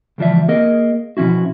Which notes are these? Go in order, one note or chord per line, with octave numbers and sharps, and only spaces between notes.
C#2 E3 F3 D5 E5
A#3 G#4 A#4 D#5
B2 F3 C#4 E4 F#4